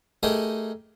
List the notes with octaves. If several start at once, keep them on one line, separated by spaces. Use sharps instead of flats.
A3 D#4 G4 G#4 A#4